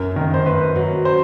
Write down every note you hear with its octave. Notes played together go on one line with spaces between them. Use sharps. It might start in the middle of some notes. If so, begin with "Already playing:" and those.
Already playing: F#2 A#4
D#3 A#4
C5
F#2 B4
F#3
C5